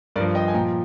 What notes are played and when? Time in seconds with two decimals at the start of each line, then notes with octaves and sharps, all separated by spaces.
0.16 G2 A#4 D5
0.20 F3
0.35 D#5 G5
0.48 G#5
0.54 A#2 F3 G5 A#5